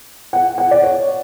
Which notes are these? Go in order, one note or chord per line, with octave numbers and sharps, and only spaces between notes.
F#5
F#5
D5
C#5